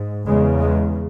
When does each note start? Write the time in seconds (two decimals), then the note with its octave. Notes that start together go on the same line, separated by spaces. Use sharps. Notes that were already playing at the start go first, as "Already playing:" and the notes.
Already playing: G#2
0.26 E2 C#3 G#3
0.60 G#3